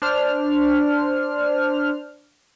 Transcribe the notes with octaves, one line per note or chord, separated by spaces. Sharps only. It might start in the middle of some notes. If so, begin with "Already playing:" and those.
D4 C5 F6